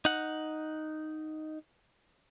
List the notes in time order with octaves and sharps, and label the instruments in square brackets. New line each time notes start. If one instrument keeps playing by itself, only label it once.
[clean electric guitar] D#4 F#5